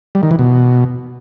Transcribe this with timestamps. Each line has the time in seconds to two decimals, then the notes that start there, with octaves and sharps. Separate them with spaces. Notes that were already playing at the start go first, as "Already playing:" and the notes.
0.15 G3
0.23 D#3
0.31 E3
0.39 B2